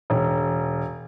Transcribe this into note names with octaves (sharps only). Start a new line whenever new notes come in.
E1